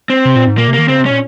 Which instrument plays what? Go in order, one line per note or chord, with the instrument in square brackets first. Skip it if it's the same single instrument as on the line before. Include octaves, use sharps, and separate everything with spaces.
[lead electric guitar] C4
[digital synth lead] C3
A#2
G#2
[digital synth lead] A#2 [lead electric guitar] A#3
[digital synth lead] C3
[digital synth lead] D#3 [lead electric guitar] A#3
[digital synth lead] C#3 [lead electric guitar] C4
[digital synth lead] C3
[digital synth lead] A#2 [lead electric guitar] C#4